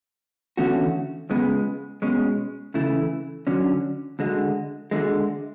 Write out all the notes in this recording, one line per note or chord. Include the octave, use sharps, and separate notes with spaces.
E2 D3 A3 C#4 F#4
C#2 C#3 G#3 B3
B2 G#3 C#4
C#3 E3 A3 E4
D3 F#3 C#4
D2 D3 G#3
D2 D3 G#3